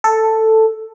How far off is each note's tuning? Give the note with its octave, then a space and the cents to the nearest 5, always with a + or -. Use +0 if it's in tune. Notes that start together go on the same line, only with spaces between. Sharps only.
A4 +5